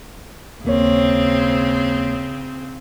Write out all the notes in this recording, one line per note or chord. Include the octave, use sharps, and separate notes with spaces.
D#2 C#3 A#3 C4 C#5